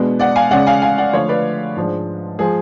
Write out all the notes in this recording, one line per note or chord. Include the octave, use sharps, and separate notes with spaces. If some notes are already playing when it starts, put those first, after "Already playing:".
Already playing: B2 G#3 B3 D4
D5 F#5
F5 G#5
C#3 G#3 C#4 D5 F#5
F5 G#5
F5 G#5
D5 F#5
D3 F3 A3 C#5 F5
B4 D5
G#2 F3 G#3 D4
F3 G#3 G#4